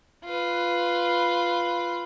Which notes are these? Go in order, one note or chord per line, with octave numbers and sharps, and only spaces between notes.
F4 B4